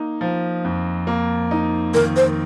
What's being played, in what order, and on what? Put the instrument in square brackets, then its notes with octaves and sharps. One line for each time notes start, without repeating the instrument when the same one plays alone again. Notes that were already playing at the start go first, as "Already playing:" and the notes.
Already playing: [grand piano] A#3 D#4
F3
F2
A#3
D#4
[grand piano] D#3 [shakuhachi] A#4
[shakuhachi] C5